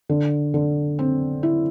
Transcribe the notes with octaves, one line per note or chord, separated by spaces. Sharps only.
D3
D3
C4
E4